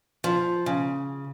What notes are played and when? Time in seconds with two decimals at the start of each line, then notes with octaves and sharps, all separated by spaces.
0.24 F3
0.66 C#3